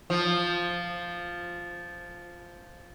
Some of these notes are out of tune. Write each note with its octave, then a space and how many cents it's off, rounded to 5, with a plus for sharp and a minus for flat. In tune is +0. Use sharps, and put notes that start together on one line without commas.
F3 +0